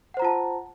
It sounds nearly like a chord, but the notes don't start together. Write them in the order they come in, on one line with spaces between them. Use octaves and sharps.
F#5 C5 A#5 F4 A5